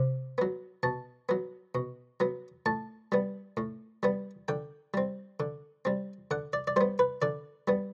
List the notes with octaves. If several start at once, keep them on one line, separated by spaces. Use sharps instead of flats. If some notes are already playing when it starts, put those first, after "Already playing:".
Already playing: C3
F#3 B3
B2 A5
F#3 B3
B2
F#3 B3
A2 A5
G3 B3
A2
G3 B3
D3 G5
G3 C4
D3
G3 C4
D3 F#5
D5
D5
G3 B3 C5
B4
D3 D5
G3 B3